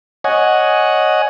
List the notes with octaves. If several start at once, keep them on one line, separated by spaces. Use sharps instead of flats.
C#5 D#5 F#5 G#5